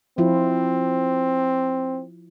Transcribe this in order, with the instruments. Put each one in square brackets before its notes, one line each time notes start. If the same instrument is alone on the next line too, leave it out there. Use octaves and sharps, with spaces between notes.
[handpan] F3 E4 F4 [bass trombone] C4